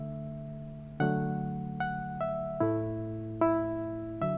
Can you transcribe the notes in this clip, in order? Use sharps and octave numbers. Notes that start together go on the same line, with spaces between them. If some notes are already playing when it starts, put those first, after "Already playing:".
Already playing: D3 A3 E5
D3 F#3 A3 F#5
F#5
E5
A2 A3 E4
E4
D3 F#3 E5